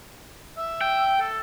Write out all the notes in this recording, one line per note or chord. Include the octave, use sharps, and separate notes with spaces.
E5
G5
A4